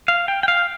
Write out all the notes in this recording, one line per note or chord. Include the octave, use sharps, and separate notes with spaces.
F5
G5
G5
F5